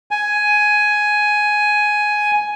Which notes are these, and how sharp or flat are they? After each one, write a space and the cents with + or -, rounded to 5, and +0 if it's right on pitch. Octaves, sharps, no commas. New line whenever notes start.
G#5 +10